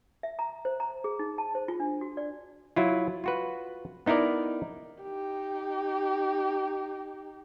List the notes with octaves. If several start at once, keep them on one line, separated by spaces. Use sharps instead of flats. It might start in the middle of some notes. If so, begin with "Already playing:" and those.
E5
A#5
C5
A#5
G#4
D#4
A5
C5
F4
D4
F#4
D5
F#3 E4 F4
F4 F#4 B4
B3 D#4 E4 A#4 D5
D#4 G4